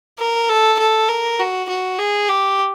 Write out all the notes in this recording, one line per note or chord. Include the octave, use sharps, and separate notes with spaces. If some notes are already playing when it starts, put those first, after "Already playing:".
A#4
A4
A4
A#4
F#4
F#4
G#4
G4